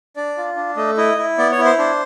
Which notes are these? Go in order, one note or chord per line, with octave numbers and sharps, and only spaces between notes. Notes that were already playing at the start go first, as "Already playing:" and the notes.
D4 D5
F4
D4
A3 D#5
E4 D#5
E4
B3 D5
C#5
E4
C5
D4 C5